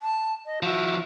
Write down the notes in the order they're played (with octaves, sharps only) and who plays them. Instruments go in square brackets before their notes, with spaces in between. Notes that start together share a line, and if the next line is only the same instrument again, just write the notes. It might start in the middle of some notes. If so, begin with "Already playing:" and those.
[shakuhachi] A5
D#5
[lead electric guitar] F3 E4 [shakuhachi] F#4